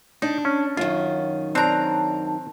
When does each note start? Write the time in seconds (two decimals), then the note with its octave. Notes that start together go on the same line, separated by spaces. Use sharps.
0.22 D4 D#4
0.45 C#4
0.77 F#2 D#3 F4
1.55 C4 D4 A#4 A#5